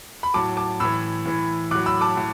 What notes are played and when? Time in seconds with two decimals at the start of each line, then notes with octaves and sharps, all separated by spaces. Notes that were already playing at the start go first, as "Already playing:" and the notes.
0.23 B5
0.34 A2 F#3 A5 D6
0.57 A5 D6
0.80 A2 E3 B5 E6
1.25 A2 E3
1.71 A2 F#3 D6 F#6
1.86 B5 E6
2.01 A5 D6
2.17 A2